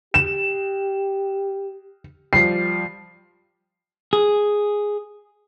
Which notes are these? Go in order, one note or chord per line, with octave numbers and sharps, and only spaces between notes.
G4 E7
F3 G3 C7
G#4